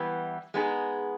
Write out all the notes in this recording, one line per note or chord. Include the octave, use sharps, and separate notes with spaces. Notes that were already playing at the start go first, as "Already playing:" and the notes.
Already playing: E3 G3 B3
G#3 B3 D#4 G#4